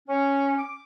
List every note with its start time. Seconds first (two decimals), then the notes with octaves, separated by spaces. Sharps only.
0.08 C#4
0.58 D6